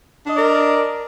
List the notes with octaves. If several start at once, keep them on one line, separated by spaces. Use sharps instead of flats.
D4 A#4 D5 D#5